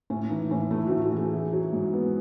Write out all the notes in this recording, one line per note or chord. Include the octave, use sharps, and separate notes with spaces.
A2 C#4
E3 D#4
A2 C#4
A3 E4
F#4
A2
F#4
E3 G#4
E4
F#3
G#2
B3